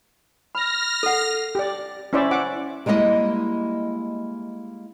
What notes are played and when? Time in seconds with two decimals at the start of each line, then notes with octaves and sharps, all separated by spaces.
0.55 B5 F6 A#6
1.03 A4 F#5
1.55 G4 D5
2.13 C#4 E4 C5 D5 E5
2.31 F#5 D6
2.86 G3 G#3 A#3 E4 D#5